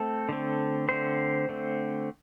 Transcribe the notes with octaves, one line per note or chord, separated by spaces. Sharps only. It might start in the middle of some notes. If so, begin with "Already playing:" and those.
Already playing: A3 C4 A4
D3 A3 C4
D3 A3 C4 C5
D3 A3 C4